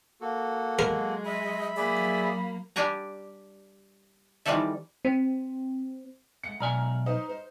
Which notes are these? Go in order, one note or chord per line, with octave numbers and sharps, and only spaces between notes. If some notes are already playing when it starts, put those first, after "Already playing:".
A#3 F#4 A4
F#3 G#3 A#4
D#5 E5 B5
F#3 A#3 G#4 D5 E5 B5
G3 D4 G4 G#5 A#5
D#3 E3 G3 C4 A4 E5
C4
G#3 A3 F#5 C#7
B1 D5 G#5 A#5 F6
D#4 B4 C5
C5